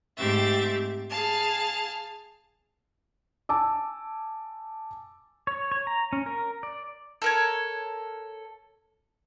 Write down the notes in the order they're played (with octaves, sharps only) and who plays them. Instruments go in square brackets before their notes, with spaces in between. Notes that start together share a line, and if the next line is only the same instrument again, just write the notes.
[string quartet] G#2 A3 C4 G4 E5 A6
G#4 F5 A5
[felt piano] G#5 A5 D6 E6
[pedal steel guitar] C#5
C#5
A#5
C#4
A#4
D5
[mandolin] A4 A#4 C#5